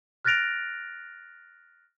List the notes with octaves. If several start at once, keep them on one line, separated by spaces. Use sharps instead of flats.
F6 F#6 A6 A#6 D7 F7